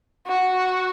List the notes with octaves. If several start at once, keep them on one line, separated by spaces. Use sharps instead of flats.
F#4